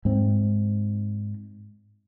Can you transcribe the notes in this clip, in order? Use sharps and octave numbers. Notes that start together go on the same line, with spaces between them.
G#2 C4